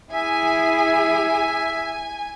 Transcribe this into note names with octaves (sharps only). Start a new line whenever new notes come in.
E4 G#4 E5 G#5